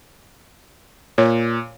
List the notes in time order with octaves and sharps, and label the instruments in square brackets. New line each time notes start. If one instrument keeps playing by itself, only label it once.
[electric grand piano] A#2 [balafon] C#5